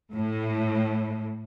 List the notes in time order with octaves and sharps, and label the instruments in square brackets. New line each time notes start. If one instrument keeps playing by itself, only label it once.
[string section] A2